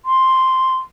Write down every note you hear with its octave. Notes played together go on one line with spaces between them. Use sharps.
C6